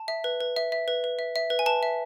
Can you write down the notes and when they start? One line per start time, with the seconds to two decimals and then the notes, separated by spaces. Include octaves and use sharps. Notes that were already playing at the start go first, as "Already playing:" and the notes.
Already playing: A5
0.08 E5
0.24 B4
0.41 B4
0.57 E5
0.72 E5
0.88 B4
1.04 B4
1.19 E5
1.36 E5
1.50 B4
1.59 G#5
1.66 B4 A5
1.83 E5